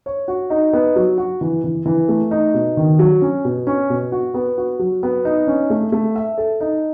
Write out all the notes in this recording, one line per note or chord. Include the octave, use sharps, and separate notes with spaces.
C#5
F#4
D#4
B3
F#3
F#4
E3
E3
E3
A3
D#4
B2
D#3
F#3
C#4
B2
C#4
B2
F#4
B3
F#4
F#3
B3
D#4
C#4
A3
A3
E5
A4
D#4